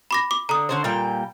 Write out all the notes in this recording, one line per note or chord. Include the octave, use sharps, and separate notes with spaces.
B5 D6 A#6
D6
D3 A#5 D#6
D3 C#4 C5
A#2 G3 G5